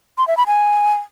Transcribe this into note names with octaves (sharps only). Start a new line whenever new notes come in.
C6
E5
B5
G#5